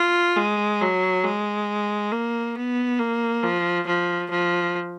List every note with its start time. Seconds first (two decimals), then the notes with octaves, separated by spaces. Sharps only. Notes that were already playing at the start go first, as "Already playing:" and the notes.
Already playing: F4
0.37 G#3
0.81 F#3
1.24 G#3
2.12 A#3
2.55 B3
2.99 A#3
3.43 F3
3.87 F3
4.30 F3